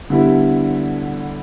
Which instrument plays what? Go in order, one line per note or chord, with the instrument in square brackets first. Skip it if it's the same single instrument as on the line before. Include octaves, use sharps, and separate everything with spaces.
[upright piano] D3 G3 B3 E4